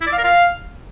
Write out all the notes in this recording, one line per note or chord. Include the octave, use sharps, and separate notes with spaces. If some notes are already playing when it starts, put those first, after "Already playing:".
E4
D5
F5
A#4
F5